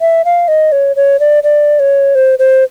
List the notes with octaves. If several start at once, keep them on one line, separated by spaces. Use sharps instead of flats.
E5
F5
D#5
C#5
C#5
D5
D5
C#5
C5
C5